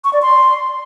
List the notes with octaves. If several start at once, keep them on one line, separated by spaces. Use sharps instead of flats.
C#6
D5
C6